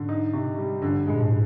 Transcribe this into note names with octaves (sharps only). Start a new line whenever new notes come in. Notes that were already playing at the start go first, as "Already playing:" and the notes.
Already playing: G#2 D3
D#4
C3
G3
G2 D3
A#2 G#3
G#2